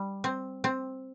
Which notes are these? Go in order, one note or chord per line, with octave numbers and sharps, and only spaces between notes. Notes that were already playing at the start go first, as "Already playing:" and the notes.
Already playing: G3
C4
C4